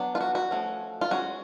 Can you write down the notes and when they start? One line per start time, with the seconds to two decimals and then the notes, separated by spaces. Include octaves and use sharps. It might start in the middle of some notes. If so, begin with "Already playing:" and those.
Already playing: F#3 B3 D4
0.15 F4
0.21 F#4
0.35 F#4
0.51 F3 A3 C#4
1.01 F4
1.11 G#3 C#4 F#4